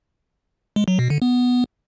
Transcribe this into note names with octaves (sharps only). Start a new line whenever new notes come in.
G#3
F#3
B2
D3
B3